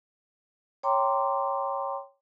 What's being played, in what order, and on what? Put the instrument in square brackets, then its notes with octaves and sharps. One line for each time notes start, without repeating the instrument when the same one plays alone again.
[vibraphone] C#5 G5 A#5 C6 D6